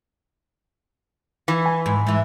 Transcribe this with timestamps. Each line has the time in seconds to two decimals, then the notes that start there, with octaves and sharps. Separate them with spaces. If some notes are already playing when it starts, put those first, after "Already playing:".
1.48 E3
1.66 G#5 B5
1.86 G#2
2.07 G#2 E3